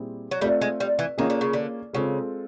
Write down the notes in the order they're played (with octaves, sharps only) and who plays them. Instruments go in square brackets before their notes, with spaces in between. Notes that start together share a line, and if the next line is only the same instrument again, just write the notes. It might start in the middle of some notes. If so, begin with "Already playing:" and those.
Already playing: [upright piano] A#2 G3 C4 E4 G#4
[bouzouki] F#3
[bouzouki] G3 [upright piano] A3 C4 F4 A4
[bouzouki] G#3
G3
E3
[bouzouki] D#3 [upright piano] A#3 C#4 F4 G#4
[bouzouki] D3
C#3
D3
[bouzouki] C#3 [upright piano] G#3 C4 F4 A4